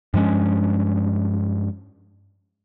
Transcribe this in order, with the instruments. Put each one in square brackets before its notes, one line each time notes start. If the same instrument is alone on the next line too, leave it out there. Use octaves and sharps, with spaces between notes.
[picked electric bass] G2 F3 G#3 C#4